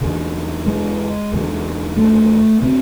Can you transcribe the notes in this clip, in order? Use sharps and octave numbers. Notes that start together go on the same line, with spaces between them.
E2 D3
G#3
E2 D3
A3
D3 C4